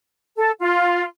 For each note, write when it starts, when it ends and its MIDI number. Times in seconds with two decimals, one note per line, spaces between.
0.37 0.51 69
0.60 1.04 65